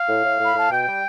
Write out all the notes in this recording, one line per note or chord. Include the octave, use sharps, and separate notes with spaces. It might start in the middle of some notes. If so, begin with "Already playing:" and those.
Already playing: F5
A2
A2
A2 B5
A2 A5
B2 G5
G3